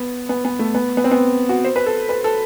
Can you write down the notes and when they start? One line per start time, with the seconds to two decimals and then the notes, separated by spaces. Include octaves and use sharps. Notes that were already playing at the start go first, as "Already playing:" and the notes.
Already playing: B3
0.29 B3
0.45 B3
0.59 A3
0.75 B3
0.97 B3
1.04 C4
1.11 B3
1.49 F#4
1.64 C5
1.76 B4
1.86 A4
2.09 B4
2.24 A4